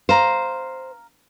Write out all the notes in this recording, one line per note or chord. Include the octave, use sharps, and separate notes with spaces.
C5 F5 A#5